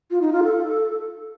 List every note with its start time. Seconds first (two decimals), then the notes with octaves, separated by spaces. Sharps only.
0.11 F4
0.21 D#4
0.32 F4
0.43 A4